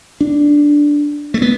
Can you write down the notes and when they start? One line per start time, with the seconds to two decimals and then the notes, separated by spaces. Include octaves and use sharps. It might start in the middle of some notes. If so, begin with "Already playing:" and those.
0.21 D4
1.34 A3
1.42 B3